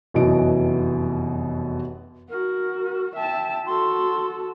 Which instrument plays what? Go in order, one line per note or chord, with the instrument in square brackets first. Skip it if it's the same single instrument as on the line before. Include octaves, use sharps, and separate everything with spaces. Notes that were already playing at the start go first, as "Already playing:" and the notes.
[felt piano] F1 F#2 B2 E3 D#5 D7
[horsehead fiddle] F#4 [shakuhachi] A#4
[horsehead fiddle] E5 A5 [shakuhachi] G5
[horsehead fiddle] F#4 A4 [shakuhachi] C6